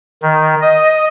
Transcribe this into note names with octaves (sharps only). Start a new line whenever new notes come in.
D#3
D#5